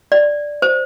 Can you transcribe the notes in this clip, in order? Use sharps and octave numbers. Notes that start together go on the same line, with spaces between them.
D5
C5